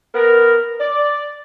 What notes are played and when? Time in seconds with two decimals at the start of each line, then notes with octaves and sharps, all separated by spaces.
0.14 B3 A#4
0.79 D5